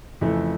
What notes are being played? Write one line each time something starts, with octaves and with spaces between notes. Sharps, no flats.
F2 C#3 E3 A3